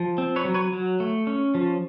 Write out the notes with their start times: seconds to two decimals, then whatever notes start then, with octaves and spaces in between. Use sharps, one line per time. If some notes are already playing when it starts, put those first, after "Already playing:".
Already playing: F3
0.18 C4
0.36 B4 C#5
0.45 F#3
0.54 B4 C#5
0.72 F#3
1.00 A3
1.27 C#4
1.54 F3